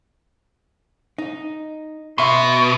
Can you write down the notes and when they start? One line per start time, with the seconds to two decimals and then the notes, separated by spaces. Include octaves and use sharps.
1.18 D#4
2.18 B2 E5 C6